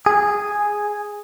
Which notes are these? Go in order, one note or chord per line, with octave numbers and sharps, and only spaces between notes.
G#4